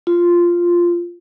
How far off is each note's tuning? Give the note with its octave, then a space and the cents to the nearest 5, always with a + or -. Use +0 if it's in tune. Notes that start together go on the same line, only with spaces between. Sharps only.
F4 -5